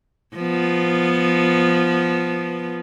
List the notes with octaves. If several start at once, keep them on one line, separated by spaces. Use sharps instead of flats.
F3 B3